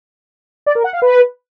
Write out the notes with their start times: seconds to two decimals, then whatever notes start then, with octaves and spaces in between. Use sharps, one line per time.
0.66 D5
0.75 A#4
0.84 F#5
0.93 F5
1.02 B4